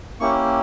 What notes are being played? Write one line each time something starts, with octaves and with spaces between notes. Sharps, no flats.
A#3 C#4 E4 G4 C#6